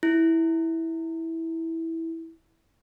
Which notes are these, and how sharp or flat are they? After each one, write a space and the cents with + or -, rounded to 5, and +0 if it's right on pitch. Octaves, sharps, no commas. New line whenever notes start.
E4 -10